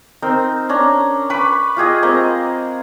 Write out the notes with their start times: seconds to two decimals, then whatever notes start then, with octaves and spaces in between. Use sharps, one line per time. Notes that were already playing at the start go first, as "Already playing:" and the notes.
0.22 C4 D#4 A#4
0.69 C#4 D4 A#5
1.30 B4 B5 C#6 D6
1.77 F4 G4 G#4 D#5
2.03 G#3 A#3 C4 D#5